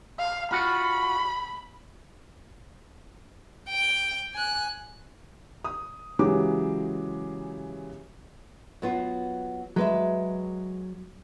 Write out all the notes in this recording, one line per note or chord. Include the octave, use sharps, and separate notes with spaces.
F5
F4 F#4 B5
G5
G#5 F#6
D#6
C#3 E3 F#3 G#3 G4 D6
F#3 B3 F4
F#3 G#3 B4 E5